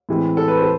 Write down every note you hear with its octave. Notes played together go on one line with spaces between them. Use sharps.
A2 E3 G#3 C4
A4
B4
C5
A4